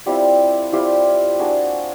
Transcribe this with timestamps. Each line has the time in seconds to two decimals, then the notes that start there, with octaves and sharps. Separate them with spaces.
0.06 G3 C4 E4 F4 G4
0.72 G3 C4 E4 F4 G4
1.39 A#3 D4 F4 F#4 G#4